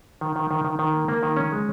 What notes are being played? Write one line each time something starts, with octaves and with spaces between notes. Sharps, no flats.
D#3
D#3
D#3
D#3
D#3
A#3
A#3
D#3
C#4
G#3